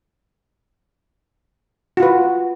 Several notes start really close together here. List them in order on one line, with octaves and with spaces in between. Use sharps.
F#4 F4 B4